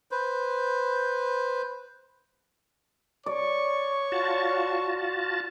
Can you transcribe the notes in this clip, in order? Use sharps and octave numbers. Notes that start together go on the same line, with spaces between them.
B4 C5
C#5 D5 C#6
F4 F#4 A5